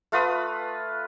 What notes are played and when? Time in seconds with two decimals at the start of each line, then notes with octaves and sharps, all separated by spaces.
0.12 A3 F4 B4 D#6